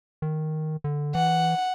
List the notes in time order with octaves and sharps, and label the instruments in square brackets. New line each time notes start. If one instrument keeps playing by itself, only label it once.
[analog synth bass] D#3
D3
[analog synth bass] E3 [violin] F#5